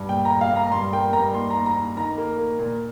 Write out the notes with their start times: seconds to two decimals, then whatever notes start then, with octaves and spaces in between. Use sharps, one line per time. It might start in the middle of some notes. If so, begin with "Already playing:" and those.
Already playing: G2
0.09 A#2 G5
0.25 A#2 A#5
0.41 F5
0.51 A#2
0.56 A#5
0.67 A#5
0.72 G2 C6
0.93 A#3 G5
1.13 G2 A#5
1.34 D#2 C6
1.50 D#2 A#5
1.66 A#5
1.76 D#2
1.97 D#3 A#5
2.17 A#3
2.38 A#3
2.59 A#2